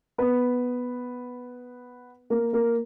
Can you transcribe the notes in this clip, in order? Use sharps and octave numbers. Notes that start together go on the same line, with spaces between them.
B3 B4
A#3 A#4
A#3 A#4